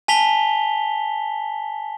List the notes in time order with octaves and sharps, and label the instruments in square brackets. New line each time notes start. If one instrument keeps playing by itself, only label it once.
[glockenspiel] G#5 A5 B6 F7 G7